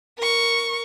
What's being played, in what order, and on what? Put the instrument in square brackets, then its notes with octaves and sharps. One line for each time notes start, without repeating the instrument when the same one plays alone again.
[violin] A#4 C#6